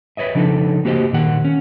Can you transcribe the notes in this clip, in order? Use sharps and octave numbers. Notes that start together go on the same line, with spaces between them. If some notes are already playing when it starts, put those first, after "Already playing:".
B4 C#5 D#5 E5
C#3 F3 D4 D#4 A4
A#3 F#4 G4 C5 D#5
A#2 D#3 F#5
C#4